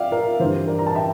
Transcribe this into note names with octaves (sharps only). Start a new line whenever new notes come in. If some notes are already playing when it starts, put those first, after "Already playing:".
Already playing: D5 E5 F5 G5
A#4
G2 E3 C5
A#4 D5
A#5
A5
E5 G5